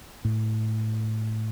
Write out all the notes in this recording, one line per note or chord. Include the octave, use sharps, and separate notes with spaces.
A2